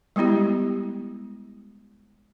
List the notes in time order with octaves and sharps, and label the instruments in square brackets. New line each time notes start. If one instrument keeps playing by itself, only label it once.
[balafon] G3 G#3 B3 E4 G4